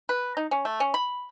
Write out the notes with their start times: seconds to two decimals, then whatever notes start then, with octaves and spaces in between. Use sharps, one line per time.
0.09 B4
0.37 D#4
0.51 C#4
0.65 A3
0.80 C#4
0.94 B5